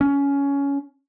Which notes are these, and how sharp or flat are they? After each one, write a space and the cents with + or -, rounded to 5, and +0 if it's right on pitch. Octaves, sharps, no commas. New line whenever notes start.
C#4 +15